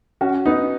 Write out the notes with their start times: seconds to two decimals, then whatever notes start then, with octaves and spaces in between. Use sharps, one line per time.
0.21 C#4 F#4
0.46 B3 D#4